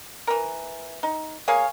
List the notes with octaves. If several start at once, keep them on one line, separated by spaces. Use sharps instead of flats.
E3 A#4
D#4
A#3 G#4 C#5 F5